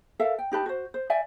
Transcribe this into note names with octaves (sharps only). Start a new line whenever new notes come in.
A4 A#4 E5 F5
G5
D#4 G4 B4 A5
F#4 C5
C5
D5 E5 G5 G#5